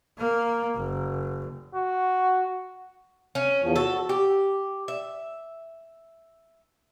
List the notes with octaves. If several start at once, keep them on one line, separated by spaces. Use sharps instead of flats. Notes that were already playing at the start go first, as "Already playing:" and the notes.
A#3
F#1
F#4
C#4
E2 F3
F#4 A4
G4
E5